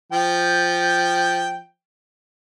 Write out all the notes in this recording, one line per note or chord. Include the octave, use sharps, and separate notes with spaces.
F3 G5